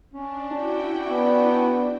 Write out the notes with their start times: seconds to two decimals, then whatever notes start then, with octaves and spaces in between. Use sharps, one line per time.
0.14 C#4 D4
0.51 D4 E4 F#4 G5
1.09 B3